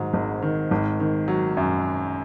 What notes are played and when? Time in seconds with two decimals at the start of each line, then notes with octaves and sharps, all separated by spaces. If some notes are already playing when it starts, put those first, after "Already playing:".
Already playing: G#2 D#3 F#3
0.14 G#1
0.42 D#3
0.71 G#1
1.00 D#3
1.28 F#3
1.57 F#2